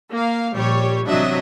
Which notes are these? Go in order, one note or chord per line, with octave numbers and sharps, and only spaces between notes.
A#3 F5
A#1 G3 G4 C#5
A1 C3 F#3 D4 D#5 E5